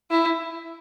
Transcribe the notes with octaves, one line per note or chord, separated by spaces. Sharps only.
E4